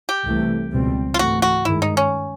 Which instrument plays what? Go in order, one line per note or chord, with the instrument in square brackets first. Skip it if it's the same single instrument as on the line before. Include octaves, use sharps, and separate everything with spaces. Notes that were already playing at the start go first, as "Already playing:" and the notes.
[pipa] G4
[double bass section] C2 C3 E3 A3
C#2 B2 G3 C4
[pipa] F4
[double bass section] G#2 E3 A3 [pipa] F#4
[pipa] F#4
[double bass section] G2 D#3 G#3 [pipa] E4
[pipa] D#4
C#4